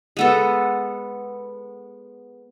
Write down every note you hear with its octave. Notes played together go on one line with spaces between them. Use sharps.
G#3 B3 A4